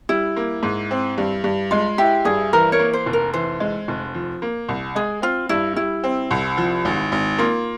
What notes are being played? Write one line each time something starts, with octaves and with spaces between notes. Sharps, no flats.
G3 E4
A#3
G#2
C4
G2
G2
G#3 F4
E4 G4
G2 G#4
E3 A#4
A#4 C#5
A#3
C5
F1
A#4
E3 C5
G#3
F1
F3
A#3
C2
G#3 G#4
C4 F4
G2 E4
G3 E4
C4
C2
F3
G#1
G#1
A#3 F4